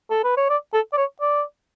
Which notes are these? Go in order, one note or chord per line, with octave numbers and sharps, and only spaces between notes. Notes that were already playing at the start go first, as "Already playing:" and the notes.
A4
B4
C#5
D5
A4
D5
C#5
D5